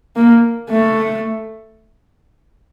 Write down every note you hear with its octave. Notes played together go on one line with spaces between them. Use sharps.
A#3
A3